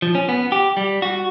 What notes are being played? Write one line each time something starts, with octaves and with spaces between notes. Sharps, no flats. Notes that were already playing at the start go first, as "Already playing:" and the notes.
F3
C#4
B3
G4
G3
F#4